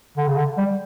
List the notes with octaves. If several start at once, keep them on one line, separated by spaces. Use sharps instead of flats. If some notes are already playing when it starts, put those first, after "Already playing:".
D3
C#3
D3
G3